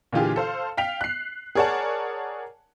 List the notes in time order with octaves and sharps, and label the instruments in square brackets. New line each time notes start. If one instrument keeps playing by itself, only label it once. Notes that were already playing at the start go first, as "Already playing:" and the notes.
[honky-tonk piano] A#2 D3 E3 F4 G4 G#4
A4 C5 F5
F5 G5 B6 F7
F#6 C7
G#4 A#4 C#5 D5 F#5 A5